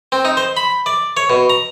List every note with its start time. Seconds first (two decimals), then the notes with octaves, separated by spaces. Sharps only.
0.12 C4
0.25 D#4
0.37 C5
0.57 B5
0.86 D5
1.17 C#5
1.30 B2
1.50 A#5